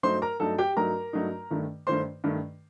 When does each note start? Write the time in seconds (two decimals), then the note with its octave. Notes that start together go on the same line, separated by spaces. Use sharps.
0.03 G2 F#3 A3 D#4 C5 C6
0.22 A#4 A#5
0.40 G2 F#3 A3 D#4 A4 A5
0.58 G4 G5
0.77 G2 F#3 A3 D#4 A#4 A#5
1.13 G2 F#3 A3 D#4
1.50 G2 D#3 A3
1.87 G2 D#3 A3 C5 C6
2.24 G2 D#3 A3